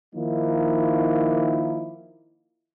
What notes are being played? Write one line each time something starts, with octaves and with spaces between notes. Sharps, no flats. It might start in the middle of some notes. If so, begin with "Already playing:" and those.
D#3 F3 A#3 D#4 E4